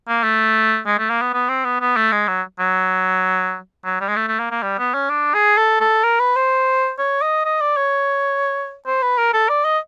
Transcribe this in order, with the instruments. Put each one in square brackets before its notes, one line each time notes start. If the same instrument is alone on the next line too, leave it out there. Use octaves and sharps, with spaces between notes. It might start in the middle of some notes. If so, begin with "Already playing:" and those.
[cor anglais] A#3
A3
G#3
A3
A#3
B3
B3
C4
B3
B3
A3
G#3
F#3
F#3
F#3
G3
G#3
A3
A3
A#3
A#3
G3
B3
C#4
D4
G#4
A4
A4
A#4
B4
C5
C#5
D#5
D#5
D5
C#5
C5
B4
A#4
A4
D5
D#5